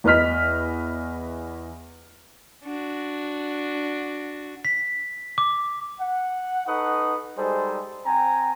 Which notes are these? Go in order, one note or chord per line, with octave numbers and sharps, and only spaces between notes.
E2 B4 D#5 F6 B6
D4 F#4
B6
D6
F#5
D#4 A4 B4 F#5 C#6 D#6
G3 G#3 D#4 G#4 A4 C5
C4 G5 G#5 A#5